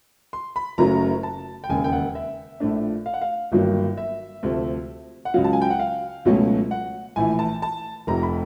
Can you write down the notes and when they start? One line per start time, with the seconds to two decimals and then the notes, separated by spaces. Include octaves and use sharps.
0.33 C6
0.56 B5
0.78 F#1 F#2 C#3 F#3 A3 A#5
1.23 A5
1.64 G5
1.69 E1 D#2 C#3 G#5
1.84 G5
1.92 F#5
2.15 E5
2.60 A#1 A2 F3 A3 D4
3.06 F5
3.14 F#5
3.22 F5
3.52 G1 G2 D#3 F#3 A#3
3.97 E5
4.43 D2 C3 F3 A3
5.25 F#5
5.34 C#2 C#3 F#3 F5
5.44 A5
5.53 G#5
5.62 G5
5.70 F#5
5.79 F5
6.25 C#2 B2 F#3 A3 C#4
6.71 F#5
7.16 A#1 A2 E3 G#5
7.39 A5
7.62 A5
8.07 F1 F2 C3 A#5
8.23 B5